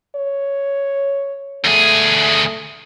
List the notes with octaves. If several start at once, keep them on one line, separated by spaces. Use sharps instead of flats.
C#5
D2 A3 G#4